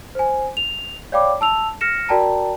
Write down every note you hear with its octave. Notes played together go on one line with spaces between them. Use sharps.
C5 G#5
F7
C#5 D5 F5 G5 B5 D6
A5 E6 F7
F6 A#6 C#7 E7
F#4 A#4 D5 G5 A5 A#5